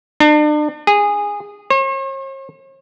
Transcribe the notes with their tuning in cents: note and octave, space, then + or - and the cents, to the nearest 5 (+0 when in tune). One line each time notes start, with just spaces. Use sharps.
D4 +40
G#4 -15
C#5 -45